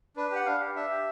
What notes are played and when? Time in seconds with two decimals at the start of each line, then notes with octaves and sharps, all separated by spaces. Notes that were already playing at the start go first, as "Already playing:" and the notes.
0.17 D4 B4
0.31 G4 F#5
0.46 D4 F5
0.61 G4
0.76 D4 E5
0.91 G4